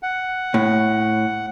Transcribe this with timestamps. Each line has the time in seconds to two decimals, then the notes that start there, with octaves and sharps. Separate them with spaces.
0.03 F#5
0.54 A2